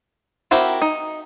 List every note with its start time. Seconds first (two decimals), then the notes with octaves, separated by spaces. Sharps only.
0.51 C4 E4 F#4 G4 A#4
0.82 D#4